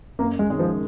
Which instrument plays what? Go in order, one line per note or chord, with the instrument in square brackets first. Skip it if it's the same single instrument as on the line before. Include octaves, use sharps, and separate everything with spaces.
[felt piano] F#2 [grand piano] A#3
[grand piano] G#3
[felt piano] D#3 G#3 C#4
[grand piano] F3